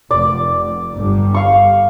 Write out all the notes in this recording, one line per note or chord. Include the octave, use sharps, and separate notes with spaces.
F1 D5
G1 G3
F5 C#6